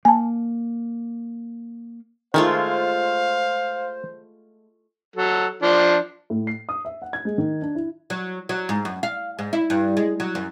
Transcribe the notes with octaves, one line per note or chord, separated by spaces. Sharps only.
A#3 G#5 A5
D#3 G#3 A3 F4 C5 F5
F#3 A4
F3 D4
A2
C7
D#6
E5
F#5
G#6
G#3
D#3
D4
E4
F#3
F#3
G#2
F#2
F5
G#2
E4
G2
G#3
F#3
F#2